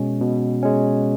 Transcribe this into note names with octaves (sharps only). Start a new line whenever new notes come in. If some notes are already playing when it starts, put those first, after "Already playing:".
Already playing: B2 G#3 C#4
B2
G#3 C#4